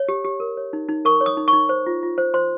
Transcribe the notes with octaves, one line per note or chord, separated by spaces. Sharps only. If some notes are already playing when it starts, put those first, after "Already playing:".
Already playing: C#5
G4
G4
A#4
C#5
D#4
D#4
A#4 C#6
C#5
D#6
D#4
C#6
D#4
C5
F4
F4
C5
C5 C6